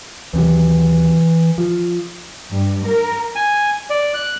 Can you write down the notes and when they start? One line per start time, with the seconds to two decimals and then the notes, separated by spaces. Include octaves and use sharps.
0.33 D#2 C3 E3 F#3
1.58 F3
2.51 G2
2.86 A#4
3.36 G#5
3.90 D5
4.14 F#6